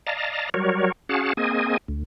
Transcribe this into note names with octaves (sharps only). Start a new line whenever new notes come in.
D5 D#5 F5 A5 A#5
F#3 G3 F#4 A#4 C#5
C#4 F#4 G#4 F5 F#5 A5
A#3 C4 G#4 D#5 G#5
D2